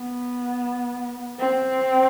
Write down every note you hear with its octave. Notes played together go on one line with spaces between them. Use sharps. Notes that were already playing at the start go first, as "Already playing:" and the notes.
Already playing: B3
C4